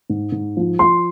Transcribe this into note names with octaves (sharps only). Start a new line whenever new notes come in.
G#2
G#2
F3
F3 C6